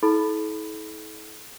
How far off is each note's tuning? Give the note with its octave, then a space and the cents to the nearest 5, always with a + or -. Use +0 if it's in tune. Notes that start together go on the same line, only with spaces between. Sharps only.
E4 -40 A4 -40 B5 +10